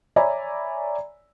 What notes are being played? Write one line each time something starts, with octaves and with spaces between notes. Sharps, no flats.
C#5 D5 E5 G#5 A#5 B5